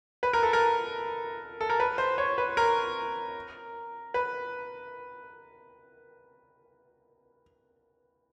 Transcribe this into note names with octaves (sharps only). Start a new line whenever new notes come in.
B4
A#4
A4
A#4
A4
A#4
B4
C5
C#5
B4
A#4
B4